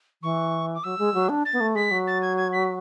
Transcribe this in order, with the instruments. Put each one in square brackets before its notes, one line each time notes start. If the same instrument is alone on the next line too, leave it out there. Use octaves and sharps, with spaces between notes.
[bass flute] E3 [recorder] C#6
[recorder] D6
[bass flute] F#3 [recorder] E6
[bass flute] G#3
F#3
D4
[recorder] A6
[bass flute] B3
A3
[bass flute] G#3 [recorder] B6
[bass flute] F#3
[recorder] A6
G#6
G#6
B6